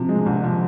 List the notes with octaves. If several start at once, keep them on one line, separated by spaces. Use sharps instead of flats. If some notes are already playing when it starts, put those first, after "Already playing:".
Already playing: C3 F3
G#3
C2
F3